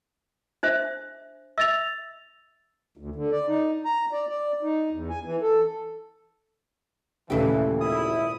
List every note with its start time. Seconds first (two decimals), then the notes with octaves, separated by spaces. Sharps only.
0.63 D4 C5 E5
1.58 E5 E6 A6 F7
2.97 D2
3.16 D3
3.32 D5
3.48 D#4
3.85 A#5
4.12 D5
4.29 D5
4.63 D#4
4.91 E2
5.10 G#5
5.25 E3
5.42 A4
7.30 D#2 A#2 C#3 E3 A3 G4
7.81 G#1 E4 D#6